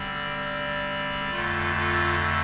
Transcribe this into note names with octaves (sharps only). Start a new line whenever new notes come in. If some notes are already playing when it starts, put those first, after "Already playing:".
Already playing: D3 G3 C4 D5
F2 D3 A3 F4
F4